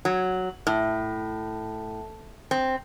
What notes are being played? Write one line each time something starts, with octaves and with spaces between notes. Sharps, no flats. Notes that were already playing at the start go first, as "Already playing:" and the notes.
F#3
A2
C4